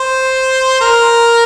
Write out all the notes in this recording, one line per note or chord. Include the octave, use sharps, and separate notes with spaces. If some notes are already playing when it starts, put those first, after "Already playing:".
Already playing: C5
A#4